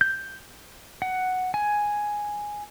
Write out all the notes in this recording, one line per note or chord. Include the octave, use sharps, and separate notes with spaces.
G6
F#5
G#5